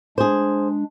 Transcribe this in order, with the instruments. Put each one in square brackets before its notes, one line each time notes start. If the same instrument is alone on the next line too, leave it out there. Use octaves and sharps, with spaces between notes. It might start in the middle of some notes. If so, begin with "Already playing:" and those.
[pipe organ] G#3 D4 [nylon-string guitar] G#4 C5